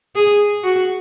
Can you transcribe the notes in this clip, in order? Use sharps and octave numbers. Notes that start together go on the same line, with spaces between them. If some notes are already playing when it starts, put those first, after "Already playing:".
G#4
F#4